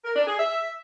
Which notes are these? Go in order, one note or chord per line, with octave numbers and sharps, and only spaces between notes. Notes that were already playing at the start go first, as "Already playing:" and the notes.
A#4
D4
G#4
E5